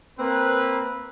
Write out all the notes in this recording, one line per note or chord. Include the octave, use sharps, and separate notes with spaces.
A#3 C4 B4